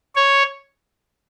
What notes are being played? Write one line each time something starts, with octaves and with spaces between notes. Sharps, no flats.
C#5